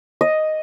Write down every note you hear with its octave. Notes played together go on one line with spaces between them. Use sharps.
D#5